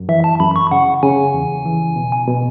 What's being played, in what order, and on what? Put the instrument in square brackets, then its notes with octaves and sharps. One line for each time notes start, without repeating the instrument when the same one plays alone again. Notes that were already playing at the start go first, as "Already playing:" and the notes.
Already playing: [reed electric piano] F#2
[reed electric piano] E3 [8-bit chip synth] E5
[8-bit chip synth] A5
[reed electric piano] F#2 [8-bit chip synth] B5
[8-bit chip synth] C#6
[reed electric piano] C#3 [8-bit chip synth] F#5
[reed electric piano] C#3 [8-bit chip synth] G#5
[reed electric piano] E2
E3
B2
B2